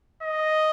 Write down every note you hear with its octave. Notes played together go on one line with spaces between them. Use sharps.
D#5